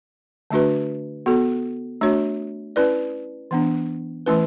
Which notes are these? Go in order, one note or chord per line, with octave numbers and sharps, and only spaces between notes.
D3 A3 D4 F#4 B4
B3 F#4 A4
A3 D4 F#4 C#5
C#4 E4 B4 D5
E3 B3 D4
E3 A3 C#4 E4 B4